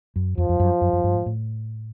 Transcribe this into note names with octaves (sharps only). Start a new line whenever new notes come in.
F#2
F2 F3
F2
F#2
F#2
F#2
G2
G#2
A2